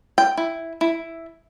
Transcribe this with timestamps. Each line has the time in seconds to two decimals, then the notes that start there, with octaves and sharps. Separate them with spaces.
0.18 G5
0.38 E4
0.81 E4